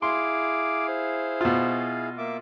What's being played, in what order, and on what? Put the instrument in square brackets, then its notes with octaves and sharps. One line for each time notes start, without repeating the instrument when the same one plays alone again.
[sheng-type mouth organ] E4 G#4 F5 [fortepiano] C6 [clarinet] D6
[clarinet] C5
[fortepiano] B2 F4
[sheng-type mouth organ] A#3 E5 D6